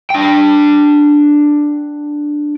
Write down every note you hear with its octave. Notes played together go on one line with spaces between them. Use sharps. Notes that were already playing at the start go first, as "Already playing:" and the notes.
D4 G5